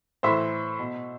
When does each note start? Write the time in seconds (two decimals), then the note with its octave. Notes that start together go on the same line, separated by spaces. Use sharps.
0.23 A2 E3 C5 E5
0.79 B2